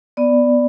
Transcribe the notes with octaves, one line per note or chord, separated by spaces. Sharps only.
B3 D5